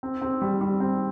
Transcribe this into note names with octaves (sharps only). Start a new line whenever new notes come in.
C4
C4
G3
G3
C4